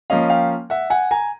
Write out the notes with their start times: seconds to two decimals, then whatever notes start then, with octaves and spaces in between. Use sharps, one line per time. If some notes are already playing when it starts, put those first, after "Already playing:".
0.10 F3 A#3 C#4 D#5 F5
0.30 F5 G5
0.70 E5 F#5
0.90 F#5 G#5
1.11 G#5 A#5